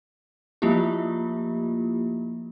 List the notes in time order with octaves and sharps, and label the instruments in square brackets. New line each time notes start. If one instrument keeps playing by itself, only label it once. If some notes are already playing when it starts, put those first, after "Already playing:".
[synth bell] F3 A3 A#3 E4 F4 G4